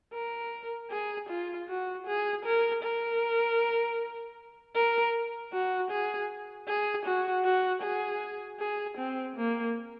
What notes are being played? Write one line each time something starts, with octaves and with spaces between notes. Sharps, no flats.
A#4
G#4
F4
F#4
G#4
A#4
A#4
A#4
F#4
G#4
G#4
F#4
F#4
G#4
G#4
C4
A#3